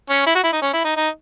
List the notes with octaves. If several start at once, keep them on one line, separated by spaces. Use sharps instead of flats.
C#4
E4
F#4
E4
D#4
C#4
E4
D#4
D#4